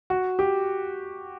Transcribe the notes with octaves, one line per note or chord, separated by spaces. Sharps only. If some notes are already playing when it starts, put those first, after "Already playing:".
F#4
G4